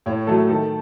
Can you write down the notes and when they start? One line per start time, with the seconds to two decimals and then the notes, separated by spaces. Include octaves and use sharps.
0.06 A2 C#5
0.27 F#3 A3 A4
0.49 D#3 A4